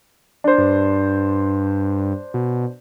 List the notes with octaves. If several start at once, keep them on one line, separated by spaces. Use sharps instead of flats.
D4 C5
G2
B2